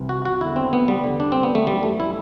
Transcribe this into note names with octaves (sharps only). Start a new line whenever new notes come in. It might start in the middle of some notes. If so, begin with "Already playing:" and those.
Already playing: C2 C3 E3
F#4
F#4
E2 D3 E4
C4
B3
G3
E2 D3
D4
C4
B3
A3
F#2 E3 G3
A3
E4